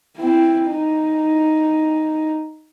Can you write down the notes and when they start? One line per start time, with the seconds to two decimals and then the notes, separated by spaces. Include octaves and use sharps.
0.18 C4 E4
0.67 D#4